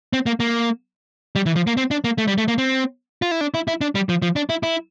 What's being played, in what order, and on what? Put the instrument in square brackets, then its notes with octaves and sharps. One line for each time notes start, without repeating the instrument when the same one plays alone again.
[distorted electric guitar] C4
A#3
A#3
G3
E3
F3
A#3
C4
D4
A#3
A3
G3
A3
A#3
C4
F4
E4
D4
E4
E4
D4
G3
F3
F3
D4
E4
E4